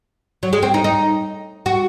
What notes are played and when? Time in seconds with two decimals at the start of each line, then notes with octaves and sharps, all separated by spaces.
0.43 F#3
0.53 G#3
0.63 C4
0.74 D#4
0.84 D#4
1.66 F#4